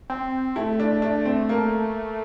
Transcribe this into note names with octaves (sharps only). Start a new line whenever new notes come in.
C4
A3 E4
D4
D4
C4
A#3